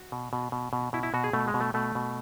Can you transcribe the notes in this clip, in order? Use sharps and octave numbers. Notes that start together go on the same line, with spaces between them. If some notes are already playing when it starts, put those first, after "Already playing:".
Already playing: F#4
B2
B2
B2
B2
B2 E4
E4
B2 F#4
G#4
B2 A3
G#3
B2
A3
B2 A3
B2